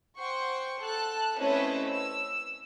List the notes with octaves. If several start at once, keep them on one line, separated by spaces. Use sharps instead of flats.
C5 F#5 G5 C6 C#6
A4 A5 F#6
A3 C4 C#4 E4 B4 D#5
E6